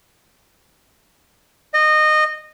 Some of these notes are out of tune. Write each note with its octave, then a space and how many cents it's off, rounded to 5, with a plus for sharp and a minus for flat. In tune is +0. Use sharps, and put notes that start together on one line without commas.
D#5 -20